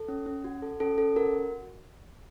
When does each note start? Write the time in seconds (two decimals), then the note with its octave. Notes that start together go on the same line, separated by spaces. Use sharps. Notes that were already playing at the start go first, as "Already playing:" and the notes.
Already playing: A4
0.08 C#4
0.26 C#4
0.44 F#4
0.62 A4
0.80 C#4 A4
0.98 C#4 A4
1.16 F#4 A#4